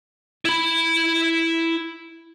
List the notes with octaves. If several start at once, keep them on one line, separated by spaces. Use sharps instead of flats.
E4 B5